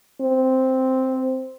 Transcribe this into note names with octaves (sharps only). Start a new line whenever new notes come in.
C4